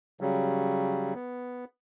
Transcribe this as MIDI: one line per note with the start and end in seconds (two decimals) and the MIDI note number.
0.21 1.14 49
0.21 1.14 54
0.21 1.14 55
1.15 1.65 59